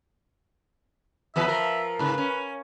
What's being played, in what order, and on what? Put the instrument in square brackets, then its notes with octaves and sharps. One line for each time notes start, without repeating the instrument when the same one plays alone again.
[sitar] E2 E3 B4 [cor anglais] E5
[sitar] F3 A#4
[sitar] G#2 C#3 [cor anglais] B4
[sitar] C#4